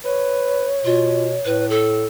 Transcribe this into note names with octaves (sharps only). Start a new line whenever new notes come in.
B4 C#5
B2 F4
A2 B4
A4